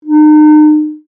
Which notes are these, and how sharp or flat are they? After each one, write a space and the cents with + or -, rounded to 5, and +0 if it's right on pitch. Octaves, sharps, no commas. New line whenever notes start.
D#4 -35